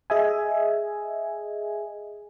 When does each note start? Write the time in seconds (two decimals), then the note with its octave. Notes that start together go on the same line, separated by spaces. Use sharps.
0.10 G#4 D#5 E5 G#5